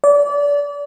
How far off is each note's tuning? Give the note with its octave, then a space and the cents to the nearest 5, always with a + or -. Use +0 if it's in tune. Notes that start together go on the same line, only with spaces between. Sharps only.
D5 -30